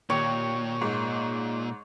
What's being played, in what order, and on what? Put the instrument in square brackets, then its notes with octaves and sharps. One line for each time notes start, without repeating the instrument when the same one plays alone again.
[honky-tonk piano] D#2 [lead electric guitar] A#2 [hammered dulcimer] C#5
[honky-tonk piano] G#2